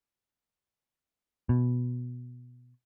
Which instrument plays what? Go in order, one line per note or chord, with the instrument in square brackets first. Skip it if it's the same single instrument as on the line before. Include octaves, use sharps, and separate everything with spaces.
[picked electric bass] B2